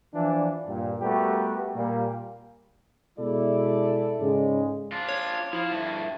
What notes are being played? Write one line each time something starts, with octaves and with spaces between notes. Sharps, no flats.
E3 F3 D4
G2 A#2 G3
G3 A3 B3 F#4 G4 A#4
A#2 G3 A#3
B2 G#3 E4 A4 D5
G#2 C#3 G#3
D4 F4
C#5
F3 E4 F4
G2 A3